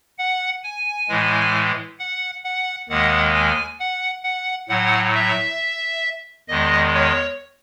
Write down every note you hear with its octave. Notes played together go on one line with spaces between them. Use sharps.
F#5
G#5
A2 E3 G#3
F#5
F#5
D#2 D#3 G#3 F#5
G#5
F#5
F#5
A2 F#3 F#5
E5
E2 D#3 G#3 D#5
C#5